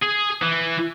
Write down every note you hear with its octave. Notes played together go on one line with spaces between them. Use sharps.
G#4
E3